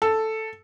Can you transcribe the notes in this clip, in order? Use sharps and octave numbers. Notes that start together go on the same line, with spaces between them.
A4